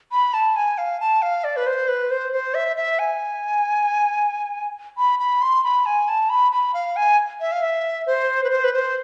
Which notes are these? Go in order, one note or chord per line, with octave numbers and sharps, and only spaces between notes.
B5
A5
G#5
F5
A5
F5
D5
B4
C5
B4
C5
C5
E5
E5
G#5
B5
B5
C6
B5
G#5
A5
B5
B5
F5
G#5
E5
F5
E5
C5
B4
C5
B4
C5